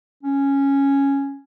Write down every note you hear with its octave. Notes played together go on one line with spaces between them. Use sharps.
C#4